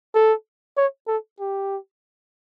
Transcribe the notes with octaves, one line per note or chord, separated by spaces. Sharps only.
A4
C#5
A4
G4